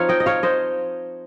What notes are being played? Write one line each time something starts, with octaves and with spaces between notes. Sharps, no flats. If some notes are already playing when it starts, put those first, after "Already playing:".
Already playing: F3 C4 D#4 C#5 F5
D#5 G5
D#5
C#5 F5
C5 D#5